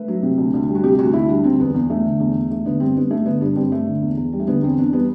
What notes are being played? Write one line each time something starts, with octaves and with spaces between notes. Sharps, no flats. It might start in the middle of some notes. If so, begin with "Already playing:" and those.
Already playing: A3 B4
F#3
C3
D2
D2
G3
F#4
C3 G4
D2 F#4
D2 E4
G3 D4
D3 C4
E2 B3
E2
A3
D3
E2
E2
A3
D3 B3
G2 C4
G2 B3
A3
D3 B3
G2 D4
G2 C4
A3
D3
E2
E2
G3
A3
D3 B3
E2 C4
E2 D4
G3 B3